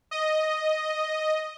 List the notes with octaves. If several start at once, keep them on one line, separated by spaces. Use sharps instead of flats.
D#5